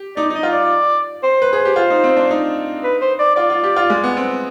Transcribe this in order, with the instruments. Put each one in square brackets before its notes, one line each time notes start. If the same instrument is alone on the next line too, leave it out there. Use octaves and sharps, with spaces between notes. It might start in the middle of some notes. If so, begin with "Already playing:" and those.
Already playing: [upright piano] G4
[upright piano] D#4 [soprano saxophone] D5
[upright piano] D#4
[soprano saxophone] D#5
[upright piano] F4
[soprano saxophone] D5
C5
[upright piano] B4
G#4
G4
F4
D#4
C4
D4
D#4
[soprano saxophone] B4
C5
D5
[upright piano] F4 [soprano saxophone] D5
[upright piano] F4
G4
F4
G#3
B3
C4